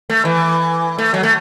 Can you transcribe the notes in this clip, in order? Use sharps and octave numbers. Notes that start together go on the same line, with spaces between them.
A3
E3
A3
F#3
A3